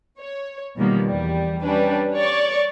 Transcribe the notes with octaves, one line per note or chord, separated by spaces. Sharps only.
C#5
B2 D#3 F3 G3 A#3 B3
E2 G3
G3 C#4 D4 B4
C#5 D5 C#6